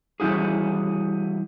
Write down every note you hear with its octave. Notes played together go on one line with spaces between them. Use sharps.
E3 G3 E4 F#4 G#4